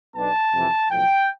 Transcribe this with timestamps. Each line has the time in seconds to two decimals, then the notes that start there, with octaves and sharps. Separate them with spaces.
0.15 B1 B2 B3 D4 A5
0.53 F2 C3 E3
0.90 B1 A2 F3 G5